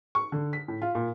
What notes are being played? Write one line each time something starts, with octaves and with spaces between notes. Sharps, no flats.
C#6
D3
B6
A2
F4
A#2